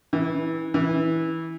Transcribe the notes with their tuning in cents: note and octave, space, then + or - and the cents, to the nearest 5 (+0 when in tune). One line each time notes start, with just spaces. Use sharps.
E3 -20
E3 -15